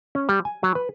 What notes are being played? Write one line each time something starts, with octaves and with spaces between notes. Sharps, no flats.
C#4
G3
G#5
F#3
B4